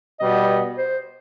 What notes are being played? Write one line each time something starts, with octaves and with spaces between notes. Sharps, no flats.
B2 G3 B3 D#5
C5